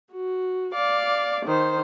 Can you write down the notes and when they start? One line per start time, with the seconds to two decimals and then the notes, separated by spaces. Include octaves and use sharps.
0.11 F#4
0.74 D5 F5 D6
1.44 D#3 C5